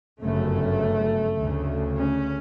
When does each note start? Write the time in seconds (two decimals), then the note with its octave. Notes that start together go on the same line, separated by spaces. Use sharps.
0.23 G1 F#2 C#3 A3
1.39 D2 C#3
1.97 C#4